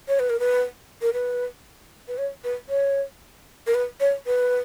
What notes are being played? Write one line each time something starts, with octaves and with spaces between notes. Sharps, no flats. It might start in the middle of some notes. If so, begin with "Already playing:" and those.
C#5
B4
A#4
B4
A#4
B4
B4
C#5
B4
C#5
A#4
B4
C#5
B4